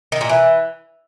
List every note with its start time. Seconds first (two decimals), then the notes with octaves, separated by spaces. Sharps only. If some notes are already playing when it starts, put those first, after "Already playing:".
0.12 D#3
0.21 A#2
0.29 E3